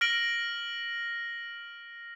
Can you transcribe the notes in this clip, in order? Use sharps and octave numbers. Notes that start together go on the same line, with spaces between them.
F6 A#6 D7 F#7